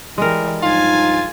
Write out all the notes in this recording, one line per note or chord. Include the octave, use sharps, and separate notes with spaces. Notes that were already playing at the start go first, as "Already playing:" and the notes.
E3 G3 G#3 A#4
G2 F3 D#4 F4 G#5 A6